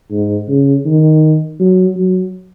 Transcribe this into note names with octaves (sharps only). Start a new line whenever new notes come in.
G#2
C#3
D#3
F#3
F#3